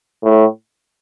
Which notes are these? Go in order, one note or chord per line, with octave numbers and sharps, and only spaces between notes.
A2